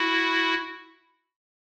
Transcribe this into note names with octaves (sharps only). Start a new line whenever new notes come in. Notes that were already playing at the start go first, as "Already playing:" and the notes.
Already playing: E4 F#4